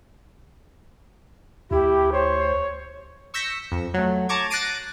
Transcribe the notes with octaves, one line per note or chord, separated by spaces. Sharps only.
D2 E4 G4
C5 C#5
C#6 E6 G6 A#6 B6 C#7
F2
F#3 A3
A5 A#5 C#6 D6 G#6
F#6 A6 A#6 C7 D7 D#7